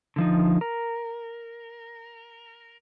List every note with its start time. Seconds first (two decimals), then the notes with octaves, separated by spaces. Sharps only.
0.16 D3 F3 D#4
0.61 A#4